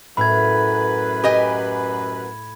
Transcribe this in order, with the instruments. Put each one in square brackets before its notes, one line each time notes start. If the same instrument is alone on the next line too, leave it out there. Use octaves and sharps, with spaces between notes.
[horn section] F#2 B4 [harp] A2 [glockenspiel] B5 G#6
[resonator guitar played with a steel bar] G4 D#5 G#5